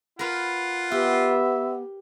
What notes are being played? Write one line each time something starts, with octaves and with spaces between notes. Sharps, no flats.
F4 A#4 B4 F#5
B3 G4 E5